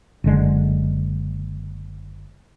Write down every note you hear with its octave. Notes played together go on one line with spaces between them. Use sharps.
F#1 D3 G#3